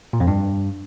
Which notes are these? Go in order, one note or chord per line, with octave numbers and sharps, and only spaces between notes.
A#2
F2
G2